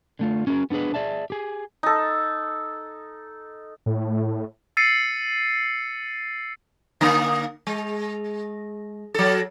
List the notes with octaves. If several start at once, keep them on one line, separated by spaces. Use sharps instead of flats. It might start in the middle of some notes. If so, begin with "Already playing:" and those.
D3 A3 F4
C#4 F#4 G#4 A#4
B3 D4 D#4 G#4 B4
G#4 D5 E5 A5
G4 G#4
D#4 A4
A2
E6 A6 C7 C#7 D#7
D3 A#3
G#3
F#3 A4